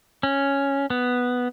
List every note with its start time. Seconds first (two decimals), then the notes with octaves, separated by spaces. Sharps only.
0.23 C#4
0.90 B3